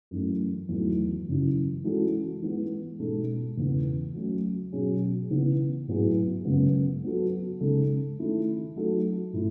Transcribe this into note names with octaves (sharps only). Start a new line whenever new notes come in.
F#2 E3 A3
E2 D#3 F#3 A3 D#4
F#2 C#3 E3
E3 G#3 C#4 F#4 A4
E3 G#3 B3
B2 G#3 D#4 A4
E2 C#3 E3 B3
F#3 A3 C#4
B2 F#3 C#4 G#4
C#3 E3 B3
A2 F#3 B3 E4 G#4
F#2 C#3 G#3 B3
F#3 B3 F#4 A4
C#3 G#3 D#4 A4
D#3 A3 E4 A4
F#3 A3 D#4 F#4 A4
A2 E3 A3 E4